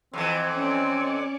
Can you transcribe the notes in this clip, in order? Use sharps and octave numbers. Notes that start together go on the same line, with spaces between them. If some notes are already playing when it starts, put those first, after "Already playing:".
F2 C3 E3 C4
C#4 D5